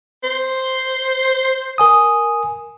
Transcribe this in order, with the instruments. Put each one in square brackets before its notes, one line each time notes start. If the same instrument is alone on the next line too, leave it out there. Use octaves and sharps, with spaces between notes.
[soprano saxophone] C5
[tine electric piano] A#4 G#5 D#6